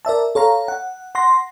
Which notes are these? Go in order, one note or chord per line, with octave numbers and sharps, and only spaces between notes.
A#4 D5 E5 A5
A4 C#5 F5 A#5
F#5
F#5 C6 A#6